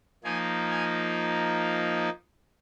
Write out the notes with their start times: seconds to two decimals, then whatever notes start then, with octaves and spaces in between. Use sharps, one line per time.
0.24 F3 A#3 D#4 G#5
0.70 G#5